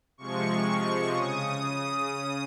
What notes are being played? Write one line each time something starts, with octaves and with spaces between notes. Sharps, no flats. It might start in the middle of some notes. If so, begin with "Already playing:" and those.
C3 F3 G#3 C#6
C#3 D#6